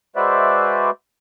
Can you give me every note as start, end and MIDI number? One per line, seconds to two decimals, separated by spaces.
0.16 0.90 56
0.16 0.90 66
0.16 0.90 71
0.16 0.90 72
0.16 0.90 74
0.16 0.90 76